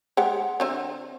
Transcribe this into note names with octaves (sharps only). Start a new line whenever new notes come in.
G#3 G4 F#5
D3 C4 E5